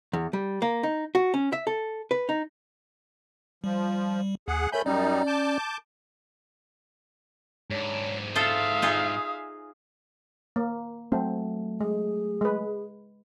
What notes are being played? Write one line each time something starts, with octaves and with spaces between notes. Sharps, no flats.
E2
G3
A#3
D#4
F#4
C#4
E5
A4
B4
D#4
F3 G3
D#2 G#4 F#5
A3 A#4 C#5 G#5 B5 G6
F#2 G3 C#4 D#4 D5
A5 D6 G6
G#2 D4 C#5
F4 A4 C5 E5 F5 D#6
D#4 F4 G#4
A#3
F#3 A3 C4
G#3 G#4
G#3 B4